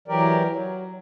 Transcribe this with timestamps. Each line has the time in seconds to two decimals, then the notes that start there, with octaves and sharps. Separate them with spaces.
0.08 E3 F#3 G4 A#4 D5
0.48 F#3